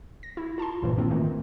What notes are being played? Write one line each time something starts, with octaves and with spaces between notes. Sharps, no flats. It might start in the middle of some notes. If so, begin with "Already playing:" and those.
A#6
E4
F4 A5 A#5 C6
B1 G2 A#2 E3 F3
D#3 A#3 C4 D4 F4
G#2 D#3 E3 A3 A#3 C4